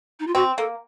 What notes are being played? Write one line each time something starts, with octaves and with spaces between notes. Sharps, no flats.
D#4
F4
C4 F#4
A#3 A4